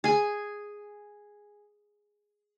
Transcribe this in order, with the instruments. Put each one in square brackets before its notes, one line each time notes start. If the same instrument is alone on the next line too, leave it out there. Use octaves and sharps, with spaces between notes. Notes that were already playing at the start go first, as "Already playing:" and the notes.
[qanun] G#4 G#5